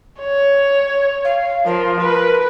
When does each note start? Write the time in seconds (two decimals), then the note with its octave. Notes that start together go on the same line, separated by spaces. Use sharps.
0.20 C#5
1.25 F5
1.66 F3 A#4
2.01 B4